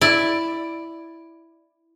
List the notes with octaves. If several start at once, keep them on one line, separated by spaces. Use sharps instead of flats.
E4 D5